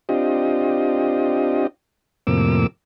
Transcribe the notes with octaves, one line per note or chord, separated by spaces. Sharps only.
C4 D4 F4 G4 D#5
F2 A2 C3 A#3 D6 E6